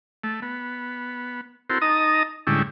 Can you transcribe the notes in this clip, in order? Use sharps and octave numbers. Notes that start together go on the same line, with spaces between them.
A3
B3
C4 E4 F#4 A4 A#4 C5
D#4 D#5 A5 A#5 D#6
A2 D3 G3 G#3 C#4 E4